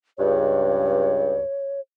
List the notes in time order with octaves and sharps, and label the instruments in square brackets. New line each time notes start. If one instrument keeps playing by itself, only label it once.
[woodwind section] C#2 G2 [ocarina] C#5